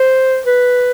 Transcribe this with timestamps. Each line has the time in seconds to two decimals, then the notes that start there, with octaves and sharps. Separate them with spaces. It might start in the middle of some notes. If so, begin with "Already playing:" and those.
Already playing: C5
0.46 B4